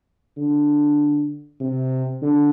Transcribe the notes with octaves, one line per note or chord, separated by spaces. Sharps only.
D3
C3
D3